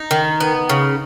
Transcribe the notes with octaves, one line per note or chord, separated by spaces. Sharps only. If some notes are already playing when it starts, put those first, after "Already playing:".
Already playing: D#4
D#3
B3
C#3